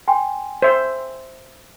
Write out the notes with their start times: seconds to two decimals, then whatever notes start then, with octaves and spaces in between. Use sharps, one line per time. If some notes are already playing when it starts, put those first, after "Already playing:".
0.08 G5 G#5 C6
0.62 C5 E5